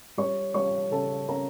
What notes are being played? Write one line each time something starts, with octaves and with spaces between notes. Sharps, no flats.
G3 C#5 C#6
G3 C#5 C#6
C#3 A4 A5
C#4 A#4 A#5